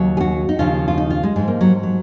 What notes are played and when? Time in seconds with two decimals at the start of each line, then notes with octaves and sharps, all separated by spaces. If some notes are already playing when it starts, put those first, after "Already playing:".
Already playing: D#2 C#3 F#3
0.17 G#4
0.21 F#4
0.49 D#4
0.59 D#2 C#3 F3 F4
0.88 F4
0.98 D#4
1.11 F4
1.23 G#3
1.36 G#2 F3 G#3
1.48 A#3
1.61 F#3
1.83 F#3